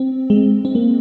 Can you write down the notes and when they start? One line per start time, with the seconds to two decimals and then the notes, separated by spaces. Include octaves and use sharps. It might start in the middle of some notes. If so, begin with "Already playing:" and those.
Already playing: C4
0.30 G#3
0.65 C4
0.75 A#3